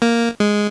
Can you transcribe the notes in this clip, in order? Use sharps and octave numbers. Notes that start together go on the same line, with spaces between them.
A#3
G#3